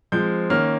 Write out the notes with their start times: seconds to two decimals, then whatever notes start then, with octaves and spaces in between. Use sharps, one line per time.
0.12 F3 G#3 C4 G6
0.50 D#3 A#3 C#4 F6